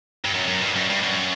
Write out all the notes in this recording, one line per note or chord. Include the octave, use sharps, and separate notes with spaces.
G2
F#2
F#2
G2
F#2
G2
F#2